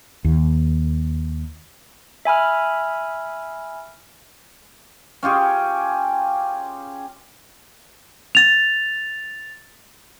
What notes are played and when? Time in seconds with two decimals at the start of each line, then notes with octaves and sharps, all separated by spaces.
0.25 D#2
2.25 E5 G#5 B5 F6
5.23 C#4 F4 G4 G#4
8.35 A6 F7